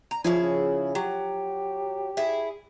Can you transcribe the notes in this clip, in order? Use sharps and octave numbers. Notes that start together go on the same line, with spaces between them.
A#5
F3 C#4 E4 G#4
C#3
F#3 G4
E4 G#4